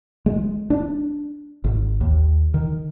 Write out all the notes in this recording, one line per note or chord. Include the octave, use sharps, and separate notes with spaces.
G#3
D4
G#1
D#2
D#3